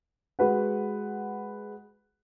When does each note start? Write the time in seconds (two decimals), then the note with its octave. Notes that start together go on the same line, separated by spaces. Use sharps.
0.39 G#3 F#4 B4 F#5